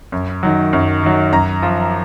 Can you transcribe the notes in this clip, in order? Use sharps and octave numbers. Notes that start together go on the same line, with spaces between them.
F#2
D#3 F#3
F#2
D#3 F#3
F#2 A#5
F3